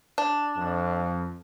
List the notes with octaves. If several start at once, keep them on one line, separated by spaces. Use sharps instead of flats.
D4
F2